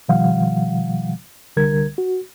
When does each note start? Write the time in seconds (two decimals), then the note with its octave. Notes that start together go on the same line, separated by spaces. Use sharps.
0.09 B2 D#3 F3 G3 F5 F#5
1.56 C2 D3 G3 A#4 G#6
1.98 F#4